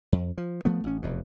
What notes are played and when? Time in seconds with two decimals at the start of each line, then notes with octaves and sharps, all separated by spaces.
0.12 F2
0.38 F3
0.65 F3 A3 B3
0.84 A1 C#4
1.02 F1 E2 B2